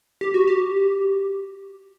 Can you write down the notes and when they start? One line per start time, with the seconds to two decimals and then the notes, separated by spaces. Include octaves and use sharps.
0.21 G4
0.34 F#4
0.47 G4